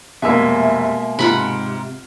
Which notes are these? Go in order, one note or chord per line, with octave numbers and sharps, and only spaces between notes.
F1 B2 G#3 A#3 E5 G#5 E6
G#2 C3 F4 F#5 B5